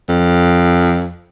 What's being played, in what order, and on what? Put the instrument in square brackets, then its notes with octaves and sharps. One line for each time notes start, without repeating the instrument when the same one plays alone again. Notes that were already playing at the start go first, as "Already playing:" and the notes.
[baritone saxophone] F2